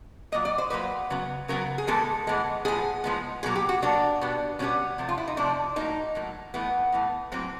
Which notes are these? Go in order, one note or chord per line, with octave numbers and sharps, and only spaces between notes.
A#2 F#3 A#3 D#5
D5
C5
A#2 F#3 A#3 B4
C#3 F#3 B3
C#3 F#3 B3 A#4
G#4
A2 E3 G#3 B3 A4
A2 E3 G#3 B3
A2 F3 G#3 B3 G#4
A2 F3 G#3 B3
B2 F#3 A#3 G#4
G4
F#4
B2 F#3 A#3 D4
B2 G3 B3
B2 G3 B3 C#4
C3 F3 A3
F4
E4
D#4
C3 F3 A3 D4
A2 F#3 A#3 D#4
A2 F#3 A#3
A2 E3 A3 B3
A2 E3 A3
A2 F#3 A#3 C4